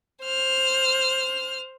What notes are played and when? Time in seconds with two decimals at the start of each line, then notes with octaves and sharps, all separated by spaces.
0.23 C5 F6